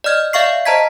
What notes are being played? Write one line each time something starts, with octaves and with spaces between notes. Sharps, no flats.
D5 D#5 F6 G#6
D5 E5 F5 C#6 C7
C5 D#5 A5 A#5 G#6 B6